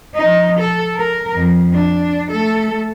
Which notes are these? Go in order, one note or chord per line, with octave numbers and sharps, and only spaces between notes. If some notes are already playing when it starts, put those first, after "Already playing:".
F3 D#4
A4
A#4
F2
D4
A3 A4